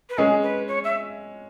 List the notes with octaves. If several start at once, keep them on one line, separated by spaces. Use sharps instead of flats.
B4
G#3 C#4 G#4
B4
C#5
E5